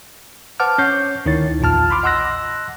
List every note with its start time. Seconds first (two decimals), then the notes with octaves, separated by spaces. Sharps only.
0.60 B4 C5 F#5 A5 D6 F6
0.78 C#4 C#5 C#6 G6 C7
1.25 D2 D#3 D#4 E4 C#5 A6
1.60 A#1 E2 A#2 F4 A5 F6
1.90 B5 C6 D6 F6
2.03 D#5 F#5 C6 E6 F#6 A#6